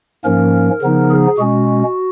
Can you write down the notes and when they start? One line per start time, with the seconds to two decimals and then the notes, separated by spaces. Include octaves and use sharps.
0.24 G#2 F3 A#3 C#4 A#4
0.81 C#3 F3 B3 D#4
1.10 G#4
1.37 B2 G#3 C#4 F#4